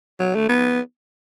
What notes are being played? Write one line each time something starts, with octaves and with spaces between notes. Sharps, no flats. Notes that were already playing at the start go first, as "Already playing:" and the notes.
F#3
A3
B3